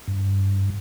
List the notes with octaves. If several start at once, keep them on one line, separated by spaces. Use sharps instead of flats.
G2